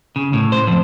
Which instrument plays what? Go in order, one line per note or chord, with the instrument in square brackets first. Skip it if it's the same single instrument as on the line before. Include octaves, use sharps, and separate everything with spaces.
[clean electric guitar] C#3
A2
C5
F2